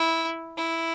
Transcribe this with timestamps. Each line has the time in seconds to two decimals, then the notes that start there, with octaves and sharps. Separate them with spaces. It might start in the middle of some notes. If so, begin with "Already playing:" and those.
Already playing: E4
0.57 E4